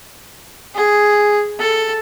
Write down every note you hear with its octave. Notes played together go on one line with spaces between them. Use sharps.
G#4
A4